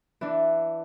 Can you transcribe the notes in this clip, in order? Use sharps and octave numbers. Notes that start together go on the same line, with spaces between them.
E3 D4